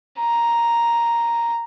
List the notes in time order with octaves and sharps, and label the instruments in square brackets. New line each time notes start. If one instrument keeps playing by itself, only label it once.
[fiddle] A#5